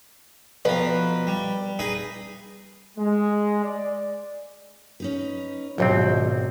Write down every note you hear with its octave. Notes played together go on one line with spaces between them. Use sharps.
B2 F3 B4 A#5
G3
D#4 G#4 B4
G#3
D5
C#4 D#4 B4
A#1 D#2 G#2 B2 F#3 C4